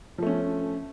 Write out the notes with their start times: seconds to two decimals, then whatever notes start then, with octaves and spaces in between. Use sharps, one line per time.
0.18 F3
0.22 A3
0.27 C#4